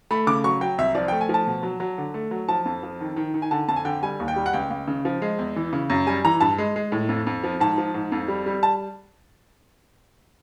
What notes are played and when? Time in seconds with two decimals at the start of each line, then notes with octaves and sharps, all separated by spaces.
0.11 A3 B5
0.27 C#3 D6
0.44 F#3 C#6
0.61 F#3 G5
0.78 C2 E5
0.95 F3 D5
1.08 G5
1.12 A3
1.21 G#5
1.29 F3
1.34 A5
1.47 B2
1.63 F#3
1.80 F#3
1.98 D3
2.14 A3
2.31 F#3
2.48 F3 A5
2.65 F2
2.83 F3
3.00 D#3
3.16 D#3
3.34 D#3
3.42 G#5
3.51 D3 A5
3.68 F2 A5
3.76 G#5
3.85 D3 G5
4.03 G3 G#5
4.20 D#2
4.28 G5
4.36 G3
4.46 F#5
4.53 C#2 G5
4.70 C#2
4.88 C#3
5.05 F3
5.22 G#3
5.39 E2
5.56 E3
5.73 C#3
5.90 F#2
6.07 G3 G#5
6.24 E3 A#5
6.41 G2 A5
6.58 G#3
6.76 G#3
6.92 A2
7.09 F2
7.27 F2
7.44 F3
7.60 G#2 A5
7.78 F3
7.94 G#2
8.12 F2
8.28 G3
8.46 G3
8.63 A5